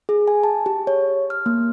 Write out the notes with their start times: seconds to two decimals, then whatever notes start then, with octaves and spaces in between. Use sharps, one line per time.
0.09 G#4
0.28 G#5
0.44 A5
0.66 G4
0.87 C#5
1.30 F6
1.46 A#3